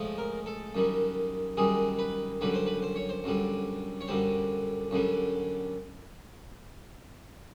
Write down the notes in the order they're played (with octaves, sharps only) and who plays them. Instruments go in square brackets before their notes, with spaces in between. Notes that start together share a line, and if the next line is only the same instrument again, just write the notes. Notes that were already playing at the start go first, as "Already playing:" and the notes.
Already playing: [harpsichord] A2 F3 G#3
A#4
A4
F#2 D#3 G3
F#2 D#3 G3 G#4
B4
F#2 D3 G3 B4
C5
B4
C5
C#5
C5
F#2 D3 G3
C#5
F#2 D3 G3 C5
F#2 D3 G3